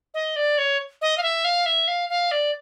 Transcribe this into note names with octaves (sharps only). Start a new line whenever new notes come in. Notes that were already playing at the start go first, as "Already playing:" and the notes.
D#5
D5
C#5
D#5
F5
E5
F5
E5
F5
F5
D5